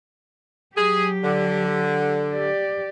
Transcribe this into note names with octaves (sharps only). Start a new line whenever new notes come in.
F#3 G4 G#4
D3
G4 D5